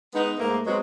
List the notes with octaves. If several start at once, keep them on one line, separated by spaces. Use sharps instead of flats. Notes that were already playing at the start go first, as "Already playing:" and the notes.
G#3 B3 D#4
G#2 A3 A#3
F#3 G#3 B3 C4 F#4